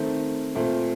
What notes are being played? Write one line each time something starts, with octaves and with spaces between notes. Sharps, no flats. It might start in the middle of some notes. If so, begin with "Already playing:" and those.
Already playing: D#3 A3 C4
A#2 A3 C4